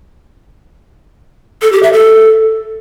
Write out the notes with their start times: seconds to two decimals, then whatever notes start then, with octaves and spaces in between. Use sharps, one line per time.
1.62 A4
1.72 G4
1.83 E5
1.93 A4